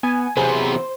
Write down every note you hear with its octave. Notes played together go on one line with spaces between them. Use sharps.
B3 G#5
C3 E3 F#3 B3 G#4 C5